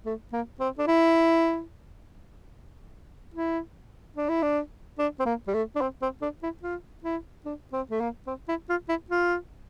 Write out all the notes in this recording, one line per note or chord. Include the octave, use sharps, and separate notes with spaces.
A3
A#3
C4
D4
E4
E4
D4
E4
D4
D4
C4
A#3
G3
A3
D4
C4
C4
D4
E4
F4
E4
D4
C4
A3
A#3
C4
E4
F4
E4
F4